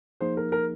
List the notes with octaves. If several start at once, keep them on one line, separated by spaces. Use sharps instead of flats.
F3 A#3 D#4 G#4 C5
A#4
A#4